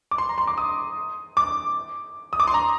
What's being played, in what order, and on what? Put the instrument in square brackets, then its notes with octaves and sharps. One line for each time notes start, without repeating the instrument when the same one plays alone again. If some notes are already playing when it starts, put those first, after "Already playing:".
[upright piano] D6
C6
A#5
C6
D6
D#6
D6
D#6
D6
C6
A#5